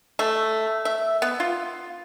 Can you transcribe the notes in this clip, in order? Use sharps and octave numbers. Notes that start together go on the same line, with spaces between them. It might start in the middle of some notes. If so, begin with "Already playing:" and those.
A3
E5
B3
F4